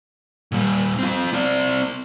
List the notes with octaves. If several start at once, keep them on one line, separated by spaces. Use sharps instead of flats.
A#2 G3
C4 F4
C4 D5